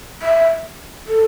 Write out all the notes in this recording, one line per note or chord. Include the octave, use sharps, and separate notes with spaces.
E5
A4